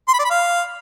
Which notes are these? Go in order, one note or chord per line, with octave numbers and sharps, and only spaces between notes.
C6
B5
D5
B5
F5